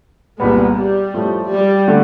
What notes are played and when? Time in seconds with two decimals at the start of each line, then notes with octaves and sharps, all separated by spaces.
0.39 C2 A#2 G3 G#3 B3
0.76 G3
1.14 A2 F3 A3
1.50 G3
1.88 D3 A3